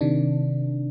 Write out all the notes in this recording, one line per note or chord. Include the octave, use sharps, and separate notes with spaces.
C3 D#3 D4